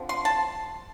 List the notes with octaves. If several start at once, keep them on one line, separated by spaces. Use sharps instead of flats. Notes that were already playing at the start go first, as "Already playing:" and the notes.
Already playing: D3 F3 C4
C6
A5